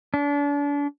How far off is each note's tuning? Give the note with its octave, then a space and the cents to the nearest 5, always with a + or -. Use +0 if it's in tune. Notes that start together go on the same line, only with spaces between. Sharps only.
D4 -35